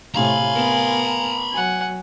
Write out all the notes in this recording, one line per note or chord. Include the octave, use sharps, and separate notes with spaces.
A2 C3 F5 G#5 A#5 B5
B3 A#4
F#3 F#5 G#5